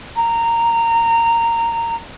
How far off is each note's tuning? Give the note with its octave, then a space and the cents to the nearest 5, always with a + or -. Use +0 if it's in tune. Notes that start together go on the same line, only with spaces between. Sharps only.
A#5 -15